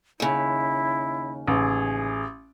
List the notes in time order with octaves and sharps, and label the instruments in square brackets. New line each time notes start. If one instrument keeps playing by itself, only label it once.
[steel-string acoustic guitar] D#2 C#3 [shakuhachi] E4
[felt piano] A1 [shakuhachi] G#4